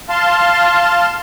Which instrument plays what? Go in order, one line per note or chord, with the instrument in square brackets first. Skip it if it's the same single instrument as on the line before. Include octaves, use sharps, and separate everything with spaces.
[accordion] F5 A5 C6